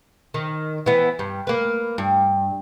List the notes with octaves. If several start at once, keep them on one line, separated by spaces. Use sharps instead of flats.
D#3
E3 B3
G2
A#3 B4
G2